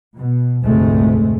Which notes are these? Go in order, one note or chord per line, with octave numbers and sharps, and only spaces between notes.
B2
F1 D2 G#2 G#3 A3